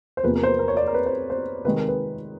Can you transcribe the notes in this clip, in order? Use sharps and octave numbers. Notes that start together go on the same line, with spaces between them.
C5
E2 C3 F3 A#3 B4
A#4
C5
B4
A#4
C#5
D5
A#4
B4
C5
C5
C3 D#3 G#3 B4
A#4
B4